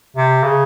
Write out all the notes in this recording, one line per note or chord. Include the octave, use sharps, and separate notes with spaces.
C3
C#3